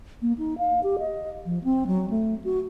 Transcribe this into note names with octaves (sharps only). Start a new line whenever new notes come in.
A#3
D#4
F5
G4
D#5
F3
C4
F#3
A3
F#4